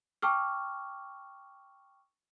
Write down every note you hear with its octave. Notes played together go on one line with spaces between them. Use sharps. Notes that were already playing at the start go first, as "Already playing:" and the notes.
G5 A5 C#6 D6 E6 F6